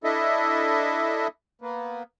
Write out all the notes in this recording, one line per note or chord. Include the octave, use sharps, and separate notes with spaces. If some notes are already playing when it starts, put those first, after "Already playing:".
D4 E4 A4 D#5 E5
A#3 B3